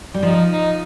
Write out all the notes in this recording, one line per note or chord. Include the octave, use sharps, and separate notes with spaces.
G3
F3 D#4
D#4